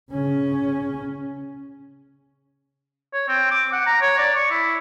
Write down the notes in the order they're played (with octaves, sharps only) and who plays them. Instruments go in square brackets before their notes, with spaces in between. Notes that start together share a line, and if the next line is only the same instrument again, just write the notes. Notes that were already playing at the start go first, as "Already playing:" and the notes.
[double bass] C#3 C#4
[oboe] C#5
C4
D6
F#5
A#5
C#5
D5
C#6
E4